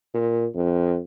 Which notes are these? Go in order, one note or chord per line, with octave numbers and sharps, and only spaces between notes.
A#2
F2